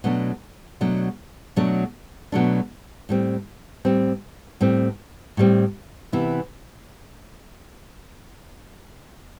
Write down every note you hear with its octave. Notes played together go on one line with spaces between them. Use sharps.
B2 F#3 A3 D4
B2 F#3 A3 D4
B2 F#3 A3 D4
B2 F#3 A3 D4
A2 G3 C4
A2 G3 C4
A2 G3 C4
A2 G3 C4
C3 E3 B3 E4